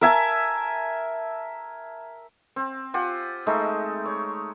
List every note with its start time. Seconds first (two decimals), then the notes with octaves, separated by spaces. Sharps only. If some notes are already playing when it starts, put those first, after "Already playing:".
0.01 A#4 E5 G#5 A5
2.56 C4
2.94 F4 G4 F#5 G#5
3.47 G#3 A3 D#4 E5
4.06 C#5